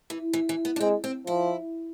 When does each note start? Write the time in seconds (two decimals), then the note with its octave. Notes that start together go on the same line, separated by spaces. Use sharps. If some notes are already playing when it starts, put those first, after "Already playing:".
0.10 E3
0.33 E3
0.49 E3
0.65 B3
0.76 D4
0.81 G#3 C4
1.04 C4
1.27 F3 E4